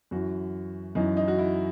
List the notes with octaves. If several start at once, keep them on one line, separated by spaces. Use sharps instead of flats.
F#2 E3 F#4
F#2 E3 D#4
D#4
F#4
E4